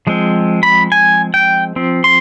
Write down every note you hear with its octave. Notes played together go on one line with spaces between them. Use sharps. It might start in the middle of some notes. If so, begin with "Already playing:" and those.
F3 G#3 C4
B5
G#5
G5
F3 C4
C6